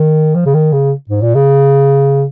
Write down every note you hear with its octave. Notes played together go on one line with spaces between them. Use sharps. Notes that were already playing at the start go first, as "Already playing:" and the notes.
Already playing: D#3
F3
C#3
D#3
C#3
G#2
A#2
C#3